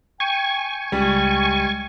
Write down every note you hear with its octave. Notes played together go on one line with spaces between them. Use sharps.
G5 G#5 C#6
C#2 G3 G#3